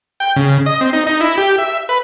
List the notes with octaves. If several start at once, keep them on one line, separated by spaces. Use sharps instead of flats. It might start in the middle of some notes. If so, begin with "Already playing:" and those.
G5
C#3
D#5
C4
D#4
D#4
E4
G4
E5
B4